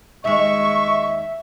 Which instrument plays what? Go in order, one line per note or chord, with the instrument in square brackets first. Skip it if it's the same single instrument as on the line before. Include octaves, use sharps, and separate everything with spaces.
[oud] D#2 G#3 [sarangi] E5 [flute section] C#6